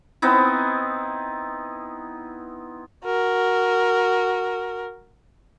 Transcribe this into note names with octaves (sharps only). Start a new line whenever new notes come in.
B3 C4 D#4 E4
F#4 A#4